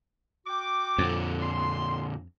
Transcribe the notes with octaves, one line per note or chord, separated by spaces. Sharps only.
F#4 G5 D6
F2 A#2 D3
C6